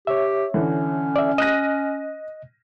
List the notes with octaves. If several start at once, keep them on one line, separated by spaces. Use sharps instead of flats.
G4 C#5 E5
D3 E3 C#4
D5 E5
D#5 F#6 A#6 D#7